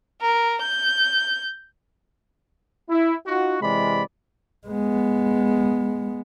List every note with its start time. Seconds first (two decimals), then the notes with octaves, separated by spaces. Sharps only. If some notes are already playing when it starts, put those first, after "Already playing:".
0.22 A#4
0.62 G6
2.89 E4
3.26 D#4 F4 F#4
3.62 C3 E3 G#3 D5 B5
4.67 G#3 B3